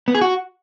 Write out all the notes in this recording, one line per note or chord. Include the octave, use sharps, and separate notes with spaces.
B3
G#4
F#4